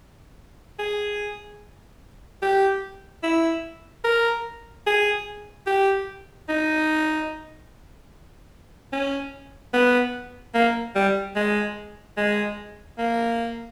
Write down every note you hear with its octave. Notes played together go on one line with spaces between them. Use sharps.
G#4
G4
E4
A#4
G#4
G4
D#4
C#4
B3
A#3
G3
G#3
G#3
A#3